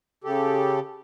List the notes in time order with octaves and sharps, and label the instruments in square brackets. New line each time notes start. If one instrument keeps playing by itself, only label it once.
[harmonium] C#3 G4 A4